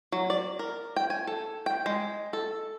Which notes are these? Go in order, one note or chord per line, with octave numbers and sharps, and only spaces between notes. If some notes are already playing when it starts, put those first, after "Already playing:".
F#3
D5
A#4
G5
G#5
A4
G5
G#3
A4